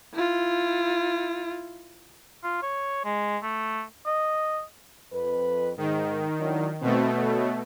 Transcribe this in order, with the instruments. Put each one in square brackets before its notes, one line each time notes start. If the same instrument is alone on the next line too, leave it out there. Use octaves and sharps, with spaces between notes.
[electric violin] E4 F4
[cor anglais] F4
C#5
G#3
A3
D#5
[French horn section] F2 B4
[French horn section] G#2 [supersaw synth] D#3
[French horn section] F#3 D4 E4
[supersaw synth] B2 A3 [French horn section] C4
[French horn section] D2 C#5